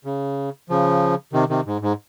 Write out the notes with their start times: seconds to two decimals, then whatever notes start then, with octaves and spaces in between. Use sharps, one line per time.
0.05 C#3
0.70 C#3 F3
1.33 C3 D#3
1.49 C3 D#3
1.66 G#2
1.81 G#2